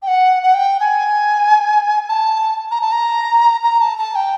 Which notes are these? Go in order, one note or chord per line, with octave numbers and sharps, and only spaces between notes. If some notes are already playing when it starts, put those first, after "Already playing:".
G5
F#5
F#5
G5
G#5
A5
A#5
A5
A#5
A#5
A5
A5
G5